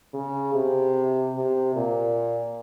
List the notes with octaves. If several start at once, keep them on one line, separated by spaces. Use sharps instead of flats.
C#3
C3
C3
A#2